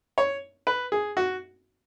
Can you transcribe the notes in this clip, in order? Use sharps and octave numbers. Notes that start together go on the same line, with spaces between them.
C#5
B4
G#4
F#4